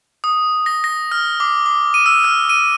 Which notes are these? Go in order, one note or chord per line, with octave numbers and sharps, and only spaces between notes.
D#6
A#6
A#6
F6
D6
D6
D#7
E6
F6
D#7